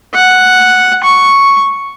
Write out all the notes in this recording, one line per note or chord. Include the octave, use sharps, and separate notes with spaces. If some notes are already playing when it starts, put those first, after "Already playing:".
F#5
C#6